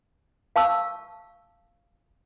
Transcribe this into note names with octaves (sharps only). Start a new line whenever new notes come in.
F5 A5 C#6 E6